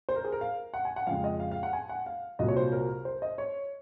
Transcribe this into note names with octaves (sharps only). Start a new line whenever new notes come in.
C5
A#4
G#4
A#4
F5
F#5
G#5
F#5
F2 C#3 G#3 F5
D#5
F5
F5
F#5
G#5
F#5
F5
C2 A#2 F#3 D#5
C#5
C5
A#4
C5
D#5
C#5